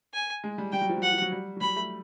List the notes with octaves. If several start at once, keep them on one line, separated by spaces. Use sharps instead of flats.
G#5
G#3
G3
G3 G5
F#3
F3
F#3
F#5
F3
F#3
G3
F#3
G3 B5
A3